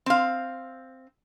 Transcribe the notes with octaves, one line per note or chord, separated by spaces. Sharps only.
C4 F5